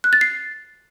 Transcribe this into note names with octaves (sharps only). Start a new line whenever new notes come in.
F#6
A6
C7